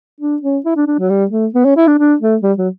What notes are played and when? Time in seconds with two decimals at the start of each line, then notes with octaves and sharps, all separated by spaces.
0.21 D4
0.42 C#4
0.65 E4
0.76 D4
0.87 D4
0.99 F#3
1.10 G3
1.31 A3
1.54 B3
1.65 C#4
1.76 E4
1.87 D4
1.99 D4
2.21 A3
2.43 G3
2.58 F#3